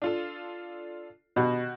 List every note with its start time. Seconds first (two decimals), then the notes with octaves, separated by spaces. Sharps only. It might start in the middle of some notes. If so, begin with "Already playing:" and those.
0.02 D4 F4 A4
1.36 B2 F#4 G4